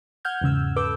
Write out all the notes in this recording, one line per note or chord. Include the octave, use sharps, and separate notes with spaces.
F#5 F6 G6 G#6
E2 G#2 C#3 E6
A4 B4 D6 E6 G6